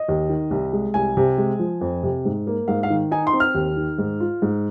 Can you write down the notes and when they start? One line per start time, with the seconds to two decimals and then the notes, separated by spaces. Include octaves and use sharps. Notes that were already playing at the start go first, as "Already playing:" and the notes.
Already playing: D#5
0.08 D#2
0.29 D#3
0.51 C2
0.73 G#3
0.94 C2 G#5
1.17 C3
1.38 G#3
1.59 F3
1.81 F2
2.03 C3
2.25 G#2
2.47 A#3
2.68 G#2 F5
2.83 F5
2.90 D#3
3.11 D#4 G#5
3.27 C6
3.33 C4
3.40 F6
3.54 D#2
3.77 D#3
3.98 G#2
4.20 F4
4.42 G#2